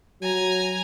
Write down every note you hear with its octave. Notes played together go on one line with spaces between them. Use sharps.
F#3 G#5 A#5